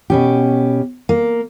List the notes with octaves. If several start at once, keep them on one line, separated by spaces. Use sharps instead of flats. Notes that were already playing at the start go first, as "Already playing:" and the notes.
B2 C#4 G4
A#3